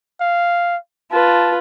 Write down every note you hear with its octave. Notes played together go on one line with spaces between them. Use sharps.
F5
F4 B4 A5